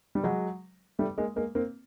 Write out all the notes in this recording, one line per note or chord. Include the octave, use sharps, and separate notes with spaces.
G3
F#3 G#3
G3 A3
G#3 A#3
G#3 A#3
A#3 C4